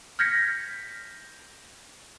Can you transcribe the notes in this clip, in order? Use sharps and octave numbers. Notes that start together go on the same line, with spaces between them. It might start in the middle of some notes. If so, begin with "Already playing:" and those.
F6 G6 G#6 A#6 B6 C#7